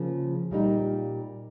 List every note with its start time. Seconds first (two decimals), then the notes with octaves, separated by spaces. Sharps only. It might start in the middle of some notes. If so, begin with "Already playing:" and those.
Already playing: C#3 F3 A#3
0.51 A#2 G3 A#3 D#4